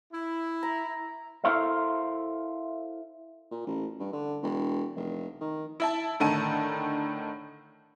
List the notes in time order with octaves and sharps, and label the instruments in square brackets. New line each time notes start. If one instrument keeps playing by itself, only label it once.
[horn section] E4
[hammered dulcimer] A#5
[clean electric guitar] E4 A4 A#4 C5 E5 F5
[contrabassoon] A#2
A1
G2
D3
E1
F1
D#3
[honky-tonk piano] E4 E5 A5
A2 D3 D#3 A5 D#7